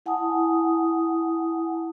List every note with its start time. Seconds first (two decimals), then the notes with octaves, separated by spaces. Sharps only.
0.06 E4 F#5 G#5 A5 D#6